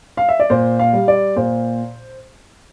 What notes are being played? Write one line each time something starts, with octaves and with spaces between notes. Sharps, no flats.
F5
E5
D5
A#2 C5
F5
G3
D5
A#2 C5